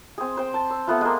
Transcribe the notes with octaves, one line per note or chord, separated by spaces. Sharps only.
C4 G#4
C5 G5
A5
E6
A3 B3 F4
G#3 A#3